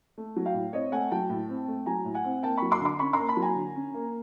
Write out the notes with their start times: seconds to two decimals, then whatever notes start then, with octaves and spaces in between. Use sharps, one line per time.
0.18 A3
0.37 F#3
0.46 F5 G5
0.54 A2
0.73 C4 C#5 D#5
0.92 A3 F#5 G#5
1.11 F#3 G5 A5
1.30 A2
1.48 C4
1.68 A3
1.86 F#3 G#5 A#5
2.05 A2
2.14 F#5 G#5
2.24 C4
2.43 A#3 G5 A5
2.57 F#3 B5 C#6
2.71 C6 D6
2.81 D3 C6 D6
2.99 C#4 B5 C#6
3.13 A#5 C6
3.19 A#3
3.29 A5 B5
3.37 F#3
3.42 G#5 A#5
3.56 D3
3.76 C#4
3.94 A#3